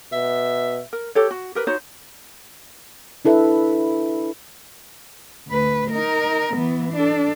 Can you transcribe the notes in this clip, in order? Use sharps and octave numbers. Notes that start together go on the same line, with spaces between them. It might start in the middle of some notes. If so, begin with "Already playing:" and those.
B2 E5
A#4
G4 A4 C#5
F#4
G4 A#4 B4
D#4 F#4 C5 C#5
D4 E4 A4 B4 E5
D2 B4
D#4 A#4
E3 B3
D4 A4